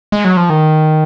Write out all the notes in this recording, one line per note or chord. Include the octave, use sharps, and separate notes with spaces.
G#3
F#3
F3
D#3